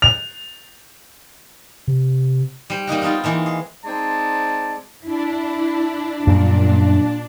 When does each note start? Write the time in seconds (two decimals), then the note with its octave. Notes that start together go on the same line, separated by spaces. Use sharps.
0.02 F7
1.87 C3
2.70 G3 C5
2.87 G3 A#3 D#4 F#4
3.02 B3 C4 D#4 F4
3.24 E3 G#3 A#3
3.46 G#4
3.85 G#3 C4 D#4 D5 A5
5.05 D4 E4
6.27 F#2 A#2 G3